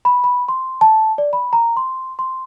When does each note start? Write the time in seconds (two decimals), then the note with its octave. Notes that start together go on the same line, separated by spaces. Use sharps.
0.05 B5
0.24 B5
0.48 C6
0.81 A5
1.18 D5
1.33 B5
1.53 A#5
1.77 C6
2.19 C6